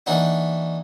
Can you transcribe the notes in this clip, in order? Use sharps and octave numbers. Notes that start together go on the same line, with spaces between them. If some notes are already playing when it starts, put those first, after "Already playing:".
E3 A#3 D4 D#4 F#4